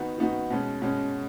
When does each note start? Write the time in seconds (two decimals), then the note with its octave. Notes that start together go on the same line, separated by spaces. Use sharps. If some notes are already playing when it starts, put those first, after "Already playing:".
Already playing: D#3 B3 D#4 F#4
0.18 D#3 B3 D#4 F#4
0.50 B2 G#3 C#4
0.82 B2 G#3 C#4